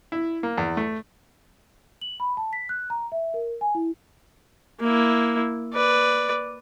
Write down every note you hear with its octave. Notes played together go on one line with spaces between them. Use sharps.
E4
A#3
E2
A3
F#7
B5
A5
B6
F#6
A#5
E5
A#4
G#5
E4
A#3 E4
B4 D5